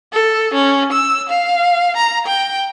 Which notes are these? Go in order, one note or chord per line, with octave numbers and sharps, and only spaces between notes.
A4
C#4
E6
F5
A#5
G5